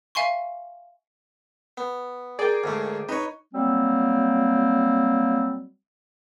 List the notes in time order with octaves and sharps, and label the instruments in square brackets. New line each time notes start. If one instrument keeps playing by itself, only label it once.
[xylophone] E5 F5 G#5 C6 C#6
[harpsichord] B3
[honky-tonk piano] G#4 A#4 [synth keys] D5 G5
[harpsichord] D2 G#2 A3
[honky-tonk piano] D#4 [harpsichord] B4 C#5
[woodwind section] F#3 G3 A#3 C4